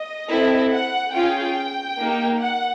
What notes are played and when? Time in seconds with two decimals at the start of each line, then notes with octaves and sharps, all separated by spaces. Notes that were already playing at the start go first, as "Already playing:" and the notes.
Already playing: D#5
0.29 C4 E4 A4
0.70 F#5
1.13 C#4 F4 G#4 G5
1.99 A#3 D#4 G4
2.41 F#5